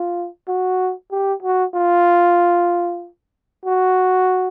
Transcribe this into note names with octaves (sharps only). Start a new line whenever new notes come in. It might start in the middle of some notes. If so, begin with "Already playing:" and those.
Already playing: F4
F#4
G4
F#4
F4
F#4